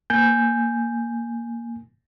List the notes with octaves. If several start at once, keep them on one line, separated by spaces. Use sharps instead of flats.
A#3 G#5 G6